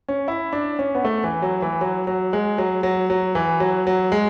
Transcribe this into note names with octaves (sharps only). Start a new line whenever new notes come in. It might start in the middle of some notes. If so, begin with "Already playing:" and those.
C#4
E4
D4
C#4
B3
A3
E3
F#3
E3
F#3
F#3
G#3
F#3
F#3
F#3
E3
F#3
F#3
G#3